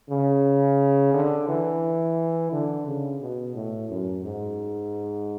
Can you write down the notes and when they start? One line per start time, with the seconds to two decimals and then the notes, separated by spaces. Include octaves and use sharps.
0.10 C#3
1.14 D3
1.48 E3
2.52 D3
2.86 C#3
3.20 B2
3.55 A2
3.90 F#2
4.24 G#2